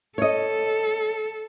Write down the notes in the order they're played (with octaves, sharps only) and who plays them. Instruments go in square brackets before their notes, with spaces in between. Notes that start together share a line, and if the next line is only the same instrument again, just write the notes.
[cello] A4 [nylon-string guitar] C#5 D#5